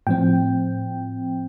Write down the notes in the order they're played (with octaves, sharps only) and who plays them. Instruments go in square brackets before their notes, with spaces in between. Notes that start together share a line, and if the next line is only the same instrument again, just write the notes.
[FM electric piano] A2 F3 C4 G5